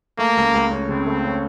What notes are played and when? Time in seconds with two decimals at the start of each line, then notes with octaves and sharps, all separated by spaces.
0.18 A3 A#3
0.37 C#2
0.54 C#2
0.71 C#4
0.89 C#3 C4
1.06 A3
1.25 C#4